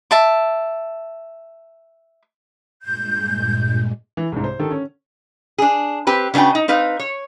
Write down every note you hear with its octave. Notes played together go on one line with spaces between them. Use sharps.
E5 A5 D6
G2 A#2 G#3 G6
E3
C2 G#2
C5
D3 D#3 G4 A4
C#4
D4 G#4
C4 G4 B4
C#3 B3 D4 F#4 G5
D#4
C4 D#4 B4 F5
C#5